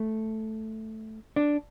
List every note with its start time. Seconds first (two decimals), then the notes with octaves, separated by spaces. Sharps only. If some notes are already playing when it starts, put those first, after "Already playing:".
Already playing: A3
1.36 D4